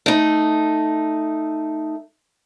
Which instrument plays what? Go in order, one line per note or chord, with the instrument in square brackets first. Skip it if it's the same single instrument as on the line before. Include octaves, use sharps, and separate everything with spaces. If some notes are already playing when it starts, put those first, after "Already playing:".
[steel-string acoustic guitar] A3 D#4